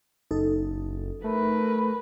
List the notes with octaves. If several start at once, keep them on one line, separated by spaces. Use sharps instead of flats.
F#1 D#4 A4
A3 A#4 B4